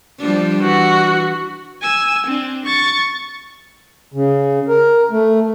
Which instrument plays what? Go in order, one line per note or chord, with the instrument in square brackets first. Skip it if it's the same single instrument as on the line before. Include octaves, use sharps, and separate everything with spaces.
[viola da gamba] F3 G3 D4
[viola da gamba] E3 [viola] F#4
[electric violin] G#5 E6
C4 D4
C#6 A6
[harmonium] C#3
A#4
A3